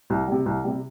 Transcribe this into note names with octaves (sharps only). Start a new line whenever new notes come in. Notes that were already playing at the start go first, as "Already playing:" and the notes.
C2
C3 G3
C2
C3 G3